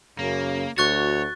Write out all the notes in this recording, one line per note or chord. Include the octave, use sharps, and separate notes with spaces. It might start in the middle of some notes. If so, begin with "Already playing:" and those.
F#2 C#3 A#3
D2 F#4 C#5 C#6 F#6 A6